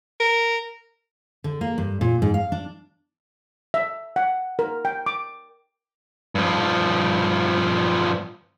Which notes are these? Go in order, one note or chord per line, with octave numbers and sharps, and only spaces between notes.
A#4
D3
A#3
G2
A#2
G#2
F5
D4
E5
F#5
A#4
G5
D6
G2 F3